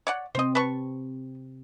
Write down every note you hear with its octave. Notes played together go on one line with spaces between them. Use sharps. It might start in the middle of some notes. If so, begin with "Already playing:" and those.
C#5 D5 F#5
C3 C4 C5 D#5
B4 A5 C#6